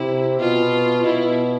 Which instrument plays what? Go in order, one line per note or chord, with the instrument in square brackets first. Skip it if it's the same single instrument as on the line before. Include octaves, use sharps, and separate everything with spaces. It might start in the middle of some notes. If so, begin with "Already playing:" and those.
Already playing: [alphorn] C3 [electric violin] E4
[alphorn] B2 [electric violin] F4
[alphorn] B2 [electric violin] E4